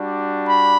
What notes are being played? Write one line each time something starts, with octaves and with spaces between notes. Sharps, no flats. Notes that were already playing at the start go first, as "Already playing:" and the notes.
Already playing: G3 D4 F#4
B5